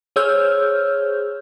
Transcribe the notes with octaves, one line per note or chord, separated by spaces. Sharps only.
G#4 C5 C#5 E6 F6 G6